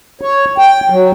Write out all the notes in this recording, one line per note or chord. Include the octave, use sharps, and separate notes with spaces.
C#5
G5
F#3